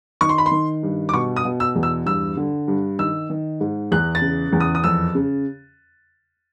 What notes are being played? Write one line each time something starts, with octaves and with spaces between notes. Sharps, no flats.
D#3 C#6
C6
B5
C6
D#3
G2
D6
B2 C#6
D#6
B2
E6
E2
E6
G2 E6
D3
G2
D#3 E6
D#3
G#2
E2 F#6
A6
C#3
E2
D#6
D#6
F2 E6
C#3